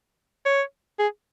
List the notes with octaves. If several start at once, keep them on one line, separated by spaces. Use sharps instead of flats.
C#5
G#4